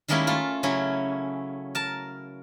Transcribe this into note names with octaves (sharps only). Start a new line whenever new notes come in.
D#3 G3 G#3 A#3 C#4 E4
A3 F4
C#3 F#3 C#4 E4
A#4 A5